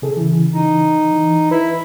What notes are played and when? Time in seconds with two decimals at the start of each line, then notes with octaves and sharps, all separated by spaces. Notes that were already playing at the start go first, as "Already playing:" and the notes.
0.02 C3 G#4 A4
0.17 C#3 E3
0.54 D#4
1.13 E3
1.51 E4 B4